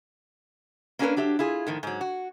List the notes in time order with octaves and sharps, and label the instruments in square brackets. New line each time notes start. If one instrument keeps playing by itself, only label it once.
[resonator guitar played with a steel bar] A#3 C#4 D4 G#4 A#4 B4
F#3 D4 G4 E5
E4 F4 G#4
A2 D#3 F3
G#2 F#3
F#4